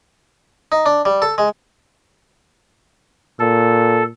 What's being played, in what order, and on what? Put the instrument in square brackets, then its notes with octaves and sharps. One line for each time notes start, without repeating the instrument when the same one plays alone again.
[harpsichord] D#4
D4
G3
A4
G#3
[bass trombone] A#2 [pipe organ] A4